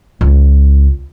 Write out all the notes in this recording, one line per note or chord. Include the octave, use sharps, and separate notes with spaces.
C#2